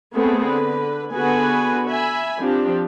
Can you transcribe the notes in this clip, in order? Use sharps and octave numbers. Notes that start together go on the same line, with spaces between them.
A3 B3 C4 G#4 A4
D3 B4
D3 B3 F#4 G#4 B4 G#5
E5 G#5 B5
F3 C4 D4 G4